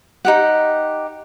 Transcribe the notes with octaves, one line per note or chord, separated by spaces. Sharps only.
D#4 G4 F#5